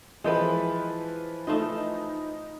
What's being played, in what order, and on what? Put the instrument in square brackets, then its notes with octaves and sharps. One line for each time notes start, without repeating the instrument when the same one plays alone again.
[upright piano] E3 F3 B4 [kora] G#3 G5
[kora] A3 F4 D#5 [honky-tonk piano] D#4